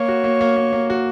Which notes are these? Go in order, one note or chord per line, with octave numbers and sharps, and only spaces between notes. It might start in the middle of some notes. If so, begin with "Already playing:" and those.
Already playing: A#3 C#5
F#4
A#3
A#3
A#3
A#3
F#4